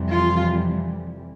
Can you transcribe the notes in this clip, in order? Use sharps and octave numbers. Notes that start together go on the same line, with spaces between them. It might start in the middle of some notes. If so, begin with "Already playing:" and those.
Already playing: F2 C3 E3 G3
F4